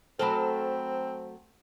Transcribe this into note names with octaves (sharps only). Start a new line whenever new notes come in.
F#3 A3 C4 A4 C5 A5 B5